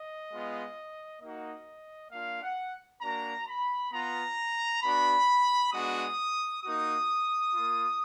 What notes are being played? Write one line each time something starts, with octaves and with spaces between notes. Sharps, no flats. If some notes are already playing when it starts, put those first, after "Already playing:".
Already playing: D#5
G#3 B3 F4
A#3 D#4 F#4 D#5
A#3 D4 F4 F5
F#5
A#3 D4 F#4 A#5
B5
B3 F4 A#5
B3 D4 F#4 B5
G#3 B3 D4 F#4 D#6
A#3 D#4 F#4 D#6
A#3 F4